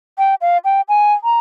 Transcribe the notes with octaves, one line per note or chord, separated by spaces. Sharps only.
G5
F5
G5
G#5
A#5